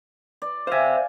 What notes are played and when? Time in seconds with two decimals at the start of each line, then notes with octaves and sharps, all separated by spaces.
0.42 D5
0.67 C5 E5 F5 G#5